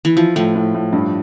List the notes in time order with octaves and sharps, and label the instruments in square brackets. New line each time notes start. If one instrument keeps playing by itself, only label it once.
[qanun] E3
[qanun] F3 [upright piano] E4
[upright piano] A2 [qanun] F3
[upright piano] A2
A2
G2